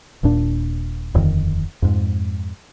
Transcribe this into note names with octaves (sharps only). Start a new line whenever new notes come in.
D#1 D#2 A#2 D4
D#1 F2 D3 D#3
F2 G#2